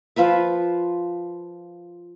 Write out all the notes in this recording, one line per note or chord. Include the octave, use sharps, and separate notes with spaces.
F3 F4 B4 E5